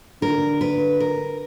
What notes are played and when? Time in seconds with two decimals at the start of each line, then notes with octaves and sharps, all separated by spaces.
0.22 D3 A#4
0.61 B4
1.00 A#4